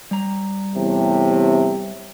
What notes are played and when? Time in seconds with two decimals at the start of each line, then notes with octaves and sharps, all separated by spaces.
0.11 G3 A#5
0.75 E2 A2 C3